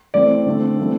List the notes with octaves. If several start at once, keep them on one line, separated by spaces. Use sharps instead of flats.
E3 A3 C4 D5
D3 A3 C4
E3 A3 C4